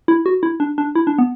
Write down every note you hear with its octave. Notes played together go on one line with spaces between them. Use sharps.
E4
F#4
E4
D4
D4
E4
D4
B3